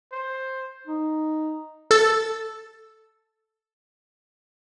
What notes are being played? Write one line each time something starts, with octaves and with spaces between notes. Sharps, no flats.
C5
D#4
A4 E6 A6